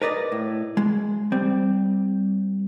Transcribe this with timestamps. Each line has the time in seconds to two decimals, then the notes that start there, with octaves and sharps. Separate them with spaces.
0.02 A#4 B4 D5 D#5
0.32 A2
0.77 G#3
1.32 G3 C4